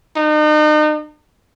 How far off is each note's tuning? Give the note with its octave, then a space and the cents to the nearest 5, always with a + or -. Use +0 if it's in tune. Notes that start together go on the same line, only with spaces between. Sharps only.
D#4 -40